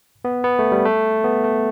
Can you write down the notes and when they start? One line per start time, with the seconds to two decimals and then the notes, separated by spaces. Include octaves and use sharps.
0.25 B3
0.44 B3
0.59 A3
0.72 G3
0.85 A3
1.24 B3
1.44 A3